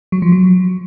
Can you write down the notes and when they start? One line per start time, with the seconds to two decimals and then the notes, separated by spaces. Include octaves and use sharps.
0.12 F#3
0.22 F3
0.32 F#3